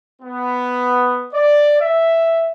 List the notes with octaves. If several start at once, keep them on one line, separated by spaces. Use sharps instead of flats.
B3
D5
E5